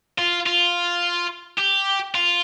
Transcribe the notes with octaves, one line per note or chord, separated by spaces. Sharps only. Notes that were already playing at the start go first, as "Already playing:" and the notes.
F4
F4
G4
F4